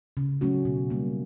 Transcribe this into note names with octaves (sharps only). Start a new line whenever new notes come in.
C#3
F#3 A3 C#4 F#4
B2
G3 A#3